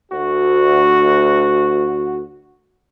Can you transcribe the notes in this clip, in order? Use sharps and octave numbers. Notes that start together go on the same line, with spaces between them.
D2 F#4